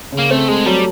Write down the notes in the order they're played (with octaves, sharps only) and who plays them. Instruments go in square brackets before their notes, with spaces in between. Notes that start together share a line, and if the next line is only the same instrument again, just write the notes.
[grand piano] C#3
[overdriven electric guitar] A#3
[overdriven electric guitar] A3 [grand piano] C4
[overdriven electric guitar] G#3 [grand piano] A3
[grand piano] F#3 [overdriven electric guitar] G3